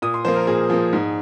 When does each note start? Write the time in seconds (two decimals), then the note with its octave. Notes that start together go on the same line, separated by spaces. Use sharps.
0.02 A#2 D#6
0.14 C6
0.25 F3 A#3 C5
0.36 A#4
0.47 A#2 G#4
0.70 F3 A#3
0.93 G#2